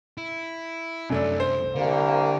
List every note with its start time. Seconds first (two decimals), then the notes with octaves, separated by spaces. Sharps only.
0.18 E4
1.10 C2 F#2 A3 D4
1.40 C5
1.76 C2 D3 A#3